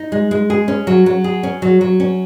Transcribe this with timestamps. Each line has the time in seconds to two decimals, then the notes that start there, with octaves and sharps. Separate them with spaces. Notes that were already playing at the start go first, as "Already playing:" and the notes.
Already playing: D#4
0.12 G#3
0.31 G#3
0.50 G#4
0.68 C#4
0.87 F#3
1.06 F#3
1.24 G#4
1.43 C#4
1.62 F#3
1.81 F#3
2.00 C#4